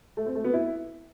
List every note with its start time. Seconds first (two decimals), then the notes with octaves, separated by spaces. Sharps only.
0.17 A3
0.26 C4
0.35 A3
0.44 B3
0.53 E4